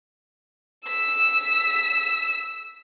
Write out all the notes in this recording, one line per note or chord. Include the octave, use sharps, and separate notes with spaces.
E6 B6